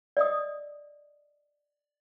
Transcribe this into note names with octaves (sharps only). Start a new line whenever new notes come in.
D5 D#5 D#6